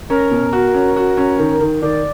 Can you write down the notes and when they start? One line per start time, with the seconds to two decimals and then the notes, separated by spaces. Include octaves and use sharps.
0.10 C#4 A#4
0.31 B2
0.53 F#4
0.74 C#4
0.96 F#4
1.17 C#4
1.39 D#3
1.60 D#3
1.82 D#3 D5